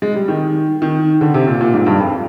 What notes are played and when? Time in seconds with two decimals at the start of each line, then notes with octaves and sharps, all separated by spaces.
0.02 G#3
0.16 G3
0.28 D#3
0.82 D#3
1.21 D3
1.34 C3
1.47 A#2
1.61 A#2
1.74 G#2
1.87 G2
2.00 F2